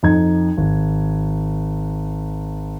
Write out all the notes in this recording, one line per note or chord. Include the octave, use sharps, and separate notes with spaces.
F2 D#4 G#6
G#1